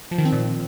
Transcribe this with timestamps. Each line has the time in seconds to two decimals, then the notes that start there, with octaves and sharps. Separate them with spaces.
0.11 F3
0.18 D#3
0.25 C4
0.32 A#2